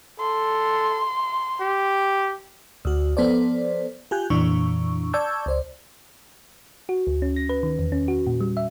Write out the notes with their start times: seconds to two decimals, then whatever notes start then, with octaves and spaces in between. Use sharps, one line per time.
0.19 A4 C6
1.61 G4
2.85 D2 F#4
3.17 F3 B3 A4 C5 D5
4.11 F4 G4 G#5 F#6 G6
4.30 F2 A#2 E3 D4 C#6
5.13 D5 A5 C#6 E6 G6 G#6
5.46 C#2 C5 D5
6.89 F#4
7.07 D2
7.22 C#4
7.36 A#6
7.49 B4
7.63 D#3
7.79 E2
7.92 C#4
8.08 F#4
8.27 A#2
8.40 G3
8.57 E5